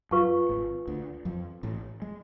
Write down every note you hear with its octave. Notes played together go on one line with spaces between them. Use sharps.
F#2 F4 B4 F5 A5 C#6
G#1 G#2
D2 D3
F2 F3
A1 A2
G#3